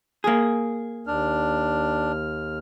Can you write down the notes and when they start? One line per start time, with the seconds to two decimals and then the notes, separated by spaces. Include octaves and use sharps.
0.24 A#3 G#4
1.07 D#2 D4 F6